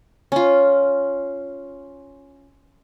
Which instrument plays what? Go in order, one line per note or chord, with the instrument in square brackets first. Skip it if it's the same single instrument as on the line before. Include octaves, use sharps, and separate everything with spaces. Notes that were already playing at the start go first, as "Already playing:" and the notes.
[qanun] C#4 F4